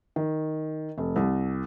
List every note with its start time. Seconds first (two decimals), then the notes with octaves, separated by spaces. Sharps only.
0.16 D#3
0.98 F1
1.16 C2